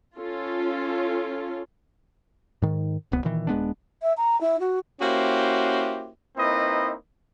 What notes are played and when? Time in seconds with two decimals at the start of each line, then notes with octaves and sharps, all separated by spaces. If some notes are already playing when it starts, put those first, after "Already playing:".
0.17 C#4 F4 A4
2.62 G#2 D#3
3.12 D1 C2 B3
3.24 A#2 D#3 E3
3.47 D#1 G#3 B3 D4
4.02 E5
4.17 A#5
4.41 E4
4.60 F#4
5.01 A#3 C#4 E4 F#4 G4 C5
6.37 A#3 C4 D#4 E4 B4 D#5